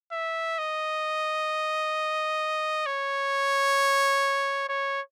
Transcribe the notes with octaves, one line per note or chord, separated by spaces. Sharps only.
E5
D#5
C#5
C#5